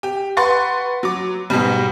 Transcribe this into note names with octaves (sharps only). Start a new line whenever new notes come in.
G4
B4 F#5 C6 C#6 A6
F#3 D6
G#2 B2 G3